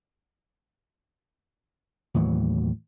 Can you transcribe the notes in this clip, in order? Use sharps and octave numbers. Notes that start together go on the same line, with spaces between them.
D#2 A2 E3 F#3